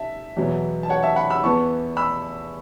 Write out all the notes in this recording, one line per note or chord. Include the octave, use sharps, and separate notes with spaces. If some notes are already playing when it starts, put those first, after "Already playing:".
Already playing: E5 A5
E2 B2 F#3 B3
A5
C#5 F#5
E5 A5
F#5 B5
B5 E6
E2 E3 B3 A5 C#6
B5 E6